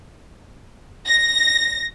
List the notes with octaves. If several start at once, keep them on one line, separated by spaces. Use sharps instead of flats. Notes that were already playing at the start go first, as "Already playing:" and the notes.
A#6